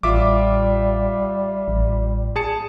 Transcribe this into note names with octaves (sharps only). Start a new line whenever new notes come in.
A1 G3 F4 E5 D6
A1
G#4 A5 C#7